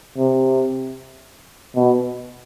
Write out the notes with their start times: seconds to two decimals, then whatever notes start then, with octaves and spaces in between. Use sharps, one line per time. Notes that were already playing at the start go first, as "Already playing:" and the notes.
0.18 C3
1.76 B2